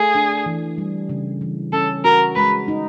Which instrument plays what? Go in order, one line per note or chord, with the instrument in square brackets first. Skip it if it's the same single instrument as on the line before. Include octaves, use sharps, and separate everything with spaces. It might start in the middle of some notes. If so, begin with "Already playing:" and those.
Already playing: [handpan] A3 [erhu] G#4
[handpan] D4
E3
G3
C#3
E3
[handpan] C#4 [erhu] A4
[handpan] F#4 [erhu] A#4
[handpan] G#3 [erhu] B4
[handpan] D#4